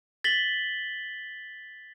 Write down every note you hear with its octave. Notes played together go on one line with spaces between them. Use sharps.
A6 B6 F#7 G7